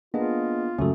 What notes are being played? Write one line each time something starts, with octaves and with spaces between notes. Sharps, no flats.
A#3 B3 D4 F4 G#4 D#5
C#2 F#2 A3 A#3 C#4 F#4 A4